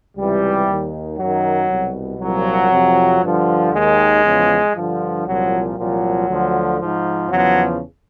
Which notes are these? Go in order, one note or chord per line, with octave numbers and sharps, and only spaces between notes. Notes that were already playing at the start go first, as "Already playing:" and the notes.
C#2 C3 E3 G3
D#2 D#3
F#2 D#3 F#3
C2 B2
C2 A#2 F3 F#3
F2 C3 F3
G2 D3 F3
D#2 D#3 G#3
E2 C#3 F3
G2 D3 F3
C2 A#2 F3 F#3
C2 A#2 F3 F#3
D2 D3 F3
G#2 F3
E2 C#3 F3 F#3